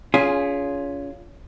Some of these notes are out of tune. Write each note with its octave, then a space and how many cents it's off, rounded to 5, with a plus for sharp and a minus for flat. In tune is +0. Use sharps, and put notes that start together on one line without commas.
C#4 +30 F4 +0 G#4 +0